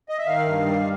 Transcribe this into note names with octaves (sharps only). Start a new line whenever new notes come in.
D#5
E5
D#3 F5
G2
G3